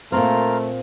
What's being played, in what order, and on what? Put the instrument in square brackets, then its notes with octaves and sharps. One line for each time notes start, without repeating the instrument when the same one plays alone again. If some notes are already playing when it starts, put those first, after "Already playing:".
[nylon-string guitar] A#2 A#3 C4 [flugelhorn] A3 [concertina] F4 A#4 F6